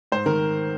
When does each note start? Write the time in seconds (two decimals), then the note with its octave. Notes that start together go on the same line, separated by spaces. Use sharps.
0.12 G#2 C5
0.26 D#3 A#4